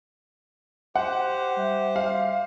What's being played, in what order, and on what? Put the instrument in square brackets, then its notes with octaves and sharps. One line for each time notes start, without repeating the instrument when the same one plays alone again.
[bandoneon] G4 C5 [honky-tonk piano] F#5
[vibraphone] G3 E5
[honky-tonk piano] F5